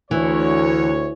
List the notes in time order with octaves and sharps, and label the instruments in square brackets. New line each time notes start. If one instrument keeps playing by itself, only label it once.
[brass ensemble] D2 C#5 [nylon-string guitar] E3